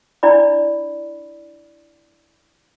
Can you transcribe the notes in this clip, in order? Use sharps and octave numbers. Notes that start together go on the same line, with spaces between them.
D4 E4 D5 B5